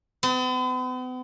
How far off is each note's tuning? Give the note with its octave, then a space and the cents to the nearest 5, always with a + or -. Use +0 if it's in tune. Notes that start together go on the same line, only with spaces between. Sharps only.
B3 +45